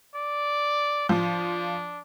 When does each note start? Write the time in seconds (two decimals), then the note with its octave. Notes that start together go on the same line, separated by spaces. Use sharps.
0.15 D5
1.09 F3 D4